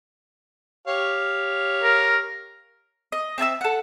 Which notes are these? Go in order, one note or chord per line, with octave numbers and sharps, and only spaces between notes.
G4 C#5 F5
A#4
D#5
C4 E5 A5 E6
A4 F#5